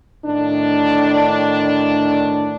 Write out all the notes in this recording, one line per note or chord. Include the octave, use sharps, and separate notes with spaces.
A2 D#3 D4